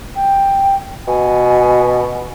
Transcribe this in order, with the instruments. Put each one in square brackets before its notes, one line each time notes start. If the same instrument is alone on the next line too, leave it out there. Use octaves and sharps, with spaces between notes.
[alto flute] G5
[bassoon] B2 [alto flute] G#5